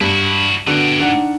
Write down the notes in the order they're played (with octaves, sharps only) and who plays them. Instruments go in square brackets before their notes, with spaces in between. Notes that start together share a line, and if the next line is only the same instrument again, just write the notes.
[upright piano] G2 [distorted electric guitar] E4 F#4
[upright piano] D3 B3 F#4 [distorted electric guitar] A3 G5
[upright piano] D#3 D4 F#5